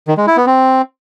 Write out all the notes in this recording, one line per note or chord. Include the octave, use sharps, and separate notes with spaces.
D#3
G#3
E4
B3
C4